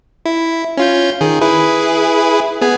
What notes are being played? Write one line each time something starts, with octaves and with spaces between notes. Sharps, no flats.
E4
C#4 F4 G6
D#3 G#4
E4 G#4 B4
B3 G#4 G#5